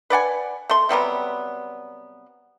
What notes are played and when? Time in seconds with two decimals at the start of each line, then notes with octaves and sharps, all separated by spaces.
0.10 B4 D5 F#5 G#5
0.69 A3 C6
0.89 C3 F#3 G3 B3